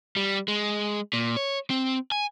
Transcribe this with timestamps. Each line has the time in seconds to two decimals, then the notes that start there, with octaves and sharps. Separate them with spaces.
0.16 G3
0.48 G#3
1.13 A#2
1.37 C#5
1.70 C4
2.12 G#5